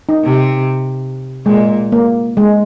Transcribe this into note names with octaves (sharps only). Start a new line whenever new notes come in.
D#4
C3
A#2 G#3
A#3
G#3